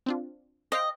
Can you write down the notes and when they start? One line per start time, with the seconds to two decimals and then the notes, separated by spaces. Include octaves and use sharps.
0.06 C4 D4 F4
0.72 C5 D#5 F5 G5